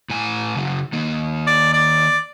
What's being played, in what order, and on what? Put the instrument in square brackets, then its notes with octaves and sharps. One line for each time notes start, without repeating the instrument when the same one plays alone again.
[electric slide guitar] A2 G#5
C#3 F#3
D#3 A#3
[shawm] D5
D5